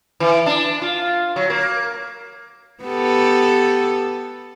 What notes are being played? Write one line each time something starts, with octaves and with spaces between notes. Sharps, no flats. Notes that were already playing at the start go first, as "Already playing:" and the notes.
E3
D4
F4
F#3
A#3
B3 G4 A4